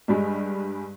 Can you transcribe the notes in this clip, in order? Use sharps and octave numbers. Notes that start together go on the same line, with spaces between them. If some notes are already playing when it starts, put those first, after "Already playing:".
G2 G3 G#3